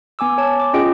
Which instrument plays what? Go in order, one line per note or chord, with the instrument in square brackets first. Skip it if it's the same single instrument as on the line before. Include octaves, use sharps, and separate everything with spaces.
[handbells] B3 G#5 D6 E6
C#5 A5
D6
C#4 F4 G#4 D#5 G5 D7